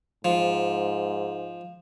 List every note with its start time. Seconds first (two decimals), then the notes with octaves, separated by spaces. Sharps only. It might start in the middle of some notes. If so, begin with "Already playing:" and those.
0.25 G#2 F3